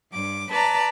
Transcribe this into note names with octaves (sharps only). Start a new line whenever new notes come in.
G2 D6
B4 D5 A5 A#5